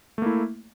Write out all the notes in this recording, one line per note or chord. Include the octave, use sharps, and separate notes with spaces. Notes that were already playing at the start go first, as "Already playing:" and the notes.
A3 A#3 E4